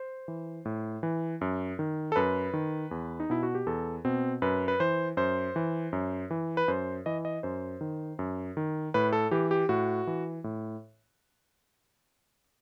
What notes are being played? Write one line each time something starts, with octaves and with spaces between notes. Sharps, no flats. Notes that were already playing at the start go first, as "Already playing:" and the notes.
Already playing: C5
E3
A2
E3
F#2
D#3
A4
F#2 B4
D#3
E2
D#4
B2 E4
F#4
G4
E2 A4
B2 C4
F#2 B4
B4
E3 C5
F#2 C5
E3
F#2
E3
B4
F#2 C5
E3 D#5
D#5
F#2 C5
D#3
F#2
D#3
A2 B4
A4
E3 G4
G4
A2 F#4
E3
A2